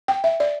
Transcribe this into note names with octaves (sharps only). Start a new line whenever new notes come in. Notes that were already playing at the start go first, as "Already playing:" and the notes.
G5
E5
D5